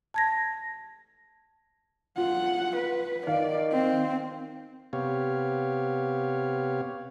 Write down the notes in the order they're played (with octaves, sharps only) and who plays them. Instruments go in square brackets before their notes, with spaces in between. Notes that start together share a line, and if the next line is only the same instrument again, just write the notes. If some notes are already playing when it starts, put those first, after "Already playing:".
[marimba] A5 G#6 A#6
[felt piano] F4 [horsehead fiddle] F#5
[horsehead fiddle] B4
[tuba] D#3 [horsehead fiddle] D5 [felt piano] F5
[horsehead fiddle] C4
[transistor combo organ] C3 B3 G4 C#5 F5